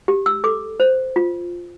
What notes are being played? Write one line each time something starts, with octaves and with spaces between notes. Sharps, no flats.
G4
E6
A4 D6
C5
F4